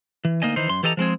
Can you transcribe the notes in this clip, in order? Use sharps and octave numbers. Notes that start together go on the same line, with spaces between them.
E3
D2 A#3 D#4 D#5 G#5
D#3 E3 D#4 C5
F#2 C6
E3 G4 A4 D#5 G#5 A#5
F3 G#3 C4 G#4